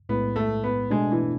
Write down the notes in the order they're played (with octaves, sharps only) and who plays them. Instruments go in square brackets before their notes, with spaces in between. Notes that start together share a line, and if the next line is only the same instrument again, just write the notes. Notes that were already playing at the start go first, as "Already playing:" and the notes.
[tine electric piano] B1 A2 G#3 [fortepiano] B3
[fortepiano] A3
B3
[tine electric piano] B2 A3 D4 [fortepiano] G#3
[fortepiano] E3